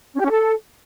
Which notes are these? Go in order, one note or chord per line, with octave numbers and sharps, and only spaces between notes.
C#4
G4
C#4
A4